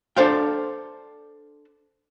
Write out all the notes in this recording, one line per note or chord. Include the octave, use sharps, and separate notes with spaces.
D4 A4 C5 F5 G5